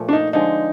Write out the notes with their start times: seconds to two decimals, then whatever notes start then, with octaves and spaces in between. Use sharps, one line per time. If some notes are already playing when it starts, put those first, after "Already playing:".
Already playing: A#2 F3 A3
0.09 D4
0.13 D#4
0.33 D3 F3 G#3 D#4